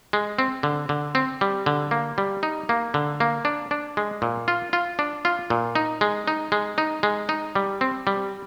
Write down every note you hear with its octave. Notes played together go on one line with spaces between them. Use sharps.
G#3
C4
D3
D3
C4
G3
D3
A#3
G3
D#4
A#3
D3
A#3
D4
D4
G#3
A#2
F4
F4
D4
F4
A#2
D#4
G#3
D#4
G#3
D#4
G#3
D#4
G3
C4
G3